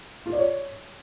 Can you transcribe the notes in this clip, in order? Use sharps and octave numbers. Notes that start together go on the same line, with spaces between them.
F4
D5
C#5